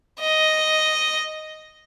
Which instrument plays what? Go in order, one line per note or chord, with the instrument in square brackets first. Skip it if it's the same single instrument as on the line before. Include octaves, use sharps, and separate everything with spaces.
[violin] D#5